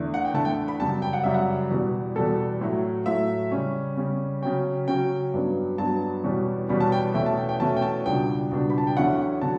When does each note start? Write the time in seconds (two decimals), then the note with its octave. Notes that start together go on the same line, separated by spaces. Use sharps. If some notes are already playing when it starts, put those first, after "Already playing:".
Already playing: E2 D3 A3
0.14 F#5
0.25 G5
0.34 E2 D3 A3 A5
0.45 G5
0.68 B5
0.80 F#2 C#3 G3 A5
1.02 G5
1.13 F#5
1.24 F#2 C#3 G3 E5
1.34 F#5
1.70 E2 B2 G3
2.16 E2 B2 G3 A4
2.61 A2 F#3 A3
3.06 A2 F#3 A3 E5
3.52 C#3 G3 C#4
3.97 C#3 G3 C#4
4.42 C#3 F#3 C#4 G5
4.88 C#3 F#3 C#4 G5
5.34 G2 F#3 B3
5.78 G2 F#3 B3 A5
6.24 E2 B2 G3 C#4
6.69 E2 B2 G3 C#4 B5
6.80 A5
6.92 G5
7.14 E2 B2 A3 C#4 E4 G5
7.26 A5
7.37 G5
7.49 G5
7.60 E2 B2 A3 C#4 E4 A5
7.77 G5
7.82 A5
8.06 C#2 B2 G3 D4 G5
8.51 C#2 B2 G3 D4
8.70 B5
8.78 A5
8.87 G5
8.96 E2 D3 F#3 C#4 E4 F#5
9.41 D3 F#3 A5